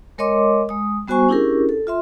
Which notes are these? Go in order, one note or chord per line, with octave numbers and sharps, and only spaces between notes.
G#3 A#4 C#5 D#5 C6 D6
G#3 D#6
G3 B3 F#4 C5 G#5 C#6
C#4 D4 E4 G4 G#4 A#4
A4
F4 E5 C6